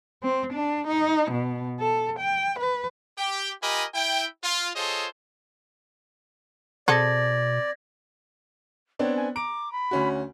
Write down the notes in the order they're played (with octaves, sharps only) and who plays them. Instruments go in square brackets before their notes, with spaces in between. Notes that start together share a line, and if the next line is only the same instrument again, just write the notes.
[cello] C4
D4
D#4
B2
A4
G5
B4
[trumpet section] G4 G5
F4 G4 A#4 D#5 G#5 B5
E4 G5
F4
F4 G#4 A4 C5 C#5 D#5
[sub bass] B2 [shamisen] C4 G#4 A4 [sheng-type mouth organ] D5 [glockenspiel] G#6 A#6
[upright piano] B3 C4 D4 [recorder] C#5
[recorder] G#5
[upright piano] A#5 D7 [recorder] D6
[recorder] B5
[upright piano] D2 C#4 F#4